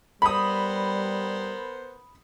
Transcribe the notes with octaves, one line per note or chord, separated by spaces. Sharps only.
G3 B3 A#4 C5 B5 D#6